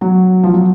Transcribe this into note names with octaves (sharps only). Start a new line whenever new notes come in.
F#3
F3
F#3